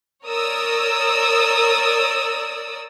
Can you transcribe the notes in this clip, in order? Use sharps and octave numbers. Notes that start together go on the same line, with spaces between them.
A#4 C#5 D5 D#6 E6